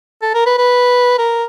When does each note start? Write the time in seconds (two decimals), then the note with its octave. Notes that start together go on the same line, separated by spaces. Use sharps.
0.22 A4
0.34 A#4
0.46 B4
0.58 B4
1.19 A#4